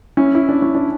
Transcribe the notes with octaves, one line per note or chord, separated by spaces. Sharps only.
C#4 E4
E4
D4
C#4
D4